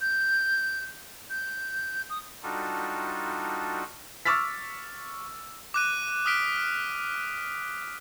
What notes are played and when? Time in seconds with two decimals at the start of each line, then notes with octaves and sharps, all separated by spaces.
0.01 G6
1.30 G6
2.10 D#6
2.43 G3 D4 D#4 F4 F#4 A4
4.25 C#6 D6 E6 F6 A6 B6
5.74 D6 F#6 D#7
6.26 D#6 F6 B6 D7